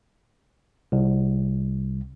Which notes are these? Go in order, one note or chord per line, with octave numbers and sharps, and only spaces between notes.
C2